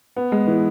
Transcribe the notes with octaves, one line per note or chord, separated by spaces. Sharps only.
B3
G#3
E3